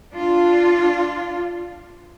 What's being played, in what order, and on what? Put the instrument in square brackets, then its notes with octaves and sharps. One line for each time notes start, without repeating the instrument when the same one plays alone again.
[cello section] D4 F4